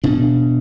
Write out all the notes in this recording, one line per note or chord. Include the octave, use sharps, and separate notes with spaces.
B2 D4